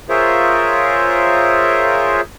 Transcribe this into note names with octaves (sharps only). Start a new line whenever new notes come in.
F4 G#4 A#4 C5 C#5 E5